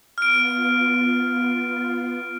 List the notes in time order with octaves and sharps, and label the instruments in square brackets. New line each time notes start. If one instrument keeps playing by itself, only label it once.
[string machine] B3 F4 [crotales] F6 D7